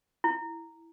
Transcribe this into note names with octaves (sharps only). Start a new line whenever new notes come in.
E4